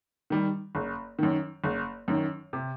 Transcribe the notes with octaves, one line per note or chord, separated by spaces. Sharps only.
D#3 G3
F#1
F#2 D#3
F#1
F#2 D#3
C3